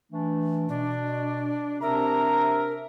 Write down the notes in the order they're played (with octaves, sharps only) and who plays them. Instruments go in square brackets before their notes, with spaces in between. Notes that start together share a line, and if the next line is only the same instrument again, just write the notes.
[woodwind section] E3 A3 D4
[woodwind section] B2 [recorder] D4
[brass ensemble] C3 A#5 [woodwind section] D4 E5 [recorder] A#4